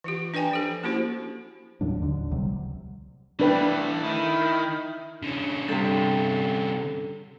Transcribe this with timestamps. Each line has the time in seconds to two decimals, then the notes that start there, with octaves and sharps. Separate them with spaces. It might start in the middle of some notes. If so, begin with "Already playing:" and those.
0.04 E3 F4 G4
0.34 D4 B4 D5 G5 G#5 A#5
0.51 F3 G4 A4
0.84 A#3 C#4 E4 F#4 G4 C5
1.81 D#2 A2 F#3 D4
2.02 D#2 D3
2.31 C#2 C3 F#3 G3
3.40 E3 A3 D4 B4 G5
4.03 D#3 E4
5.23 D3 C#4
5.68 G2 C3 A4